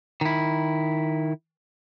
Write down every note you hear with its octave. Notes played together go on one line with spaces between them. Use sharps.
D#3 E4